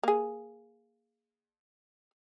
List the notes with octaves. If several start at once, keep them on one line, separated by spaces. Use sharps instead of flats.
A#3 G#4